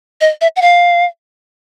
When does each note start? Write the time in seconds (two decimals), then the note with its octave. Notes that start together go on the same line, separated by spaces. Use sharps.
0.21 D#5
0.41 E5
0.56 F#5
0.62 F5